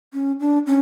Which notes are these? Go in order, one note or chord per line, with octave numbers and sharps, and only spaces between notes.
C#4
D4
C#4